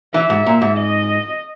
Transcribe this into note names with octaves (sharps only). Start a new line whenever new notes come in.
E3 E5
G#2
A#2
G#2
D#5